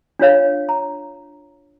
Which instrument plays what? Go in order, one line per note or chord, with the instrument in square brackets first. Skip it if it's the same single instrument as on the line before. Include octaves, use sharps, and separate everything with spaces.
[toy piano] D4 F4 C#5 F5
A#5